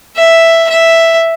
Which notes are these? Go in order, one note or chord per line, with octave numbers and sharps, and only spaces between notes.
E5
E5